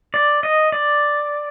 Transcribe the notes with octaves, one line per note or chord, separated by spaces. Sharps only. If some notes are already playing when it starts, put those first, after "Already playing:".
D5
D#5
D5